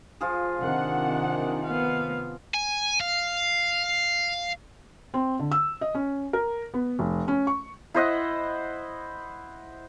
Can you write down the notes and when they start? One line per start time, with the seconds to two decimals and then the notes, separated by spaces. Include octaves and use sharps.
0.21 F3 F4 G#4
0.60 C3 D#3 D4 F#5
1.65 B3 F5
2.54 G#5
3.00 F5
5.14 C4
5.39 D3
5.52 E6
5.81 D#5
5.95 C#4
6.33 A#4
6.74 B3
6.99 F1
7.28 C#4
7.47 C#6
7.94 E4 C5 D#5 F#5